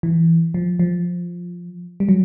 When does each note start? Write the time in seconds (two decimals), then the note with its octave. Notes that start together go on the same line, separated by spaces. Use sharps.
0.03 E3
0.54 F3
0.79 F3
2.00 G3
2.09 F#3